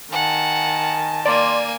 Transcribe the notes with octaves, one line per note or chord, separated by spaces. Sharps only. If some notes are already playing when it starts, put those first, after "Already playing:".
D#3 F#5 G#5 A5
A#3 D5 G#5 C6